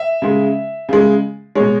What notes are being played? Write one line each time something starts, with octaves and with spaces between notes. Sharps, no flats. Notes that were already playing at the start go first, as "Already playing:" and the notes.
Already playing: E5
C#3 G#3
C#3 G#3
B2 G#3 C#5